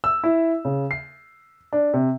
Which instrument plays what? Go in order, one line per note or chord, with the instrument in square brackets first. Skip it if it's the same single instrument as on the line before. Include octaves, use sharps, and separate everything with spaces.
[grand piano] E6
E4
C#3
C7
D4
C3